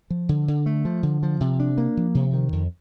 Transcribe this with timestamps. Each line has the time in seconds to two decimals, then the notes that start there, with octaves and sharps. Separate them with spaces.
0.10 F3
0.29 D3
0.48 D3
0.66 A3
0.85 F3
1.03 D3
1.23 F3
1.40 C3
1.60 D4
1.78 A#3
1.97 F3
2.15 C3
2.33 D#3
2.53 F2